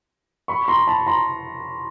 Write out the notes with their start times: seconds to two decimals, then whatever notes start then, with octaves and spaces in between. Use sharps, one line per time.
0.48 B5 C#6
0.68 A#5 C6
0.87 A5 B5
1.06 A#5 C6